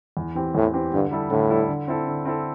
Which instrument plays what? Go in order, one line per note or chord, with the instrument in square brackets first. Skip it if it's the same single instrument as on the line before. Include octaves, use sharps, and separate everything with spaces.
[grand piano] E2
E3 C4 G4
[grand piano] E2 [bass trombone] A2
[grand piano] E3 C4 G4
[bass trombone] G2 [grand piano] D3
[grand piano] G3 E4 A4
[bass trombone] A2 [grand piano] D3
[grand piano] G3 E4 A4
D3
C4 E4 A4
D3
C4 E4 A4